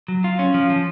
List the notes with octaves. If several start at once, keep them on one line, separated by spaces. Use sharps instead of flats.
F#3
F4
C#4
F3
F3